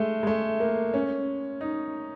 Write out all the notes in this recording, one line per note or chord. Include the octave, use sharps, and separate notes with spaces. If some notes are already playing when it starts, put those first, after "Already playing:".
Already playing: G#3 A3
G#3
A3
A#3
C#4
D#4